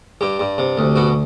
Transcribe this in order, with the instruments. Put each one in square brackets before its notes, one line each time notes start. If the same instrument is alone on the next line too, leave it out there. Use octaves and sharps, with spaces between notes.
[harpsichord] G2 G4
G2
C3
D2
B2 F#4